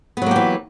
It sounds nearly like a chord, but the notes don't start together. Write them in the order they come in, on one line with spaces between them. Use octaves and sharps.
B3 F#3 A#3 G4 E3